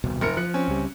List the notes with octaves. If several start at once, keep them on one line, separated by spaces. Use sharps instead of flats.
D#1 C2 B2
F#1 A#4 C#7
F3 F#6 C#7
C4 C#4
C#2 G3